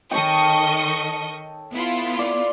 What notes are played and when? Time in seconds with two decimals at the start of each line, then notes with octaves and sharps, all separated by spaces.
0.11 D#3 A4 C#5 D#5 G5 C#6
1.72 B3 E4 F4
2.19 D5